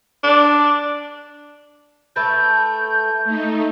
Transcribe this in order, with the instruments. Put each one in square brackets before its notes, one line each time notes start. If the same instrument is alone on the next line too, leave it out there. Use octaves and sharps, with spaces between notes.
[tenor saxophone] D4
[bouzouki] A3 B4 A5 [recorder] G6
[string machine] A3 D#4